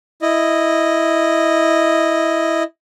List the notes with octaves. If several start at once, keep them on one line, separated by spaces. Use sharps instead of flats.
E4 D#5